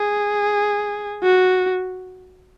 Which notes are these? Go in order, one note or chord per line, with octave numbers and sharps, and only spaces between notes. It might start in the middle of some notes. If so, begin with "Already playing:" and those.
Already playing: G#4
F#4